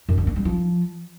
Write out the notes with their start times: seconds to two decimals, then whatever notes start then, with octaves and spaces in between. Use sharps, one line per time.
0.09 F#2
0.18 D3
0.27 A#3
0.36 G3
0.45 F3